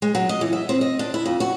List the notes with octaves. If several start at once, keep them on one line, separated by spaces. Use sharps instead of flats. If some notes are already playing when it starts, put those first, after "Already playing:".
G#3
F#3
D#5
E3
E5
C4
D#5
D4
E4
F2
F#4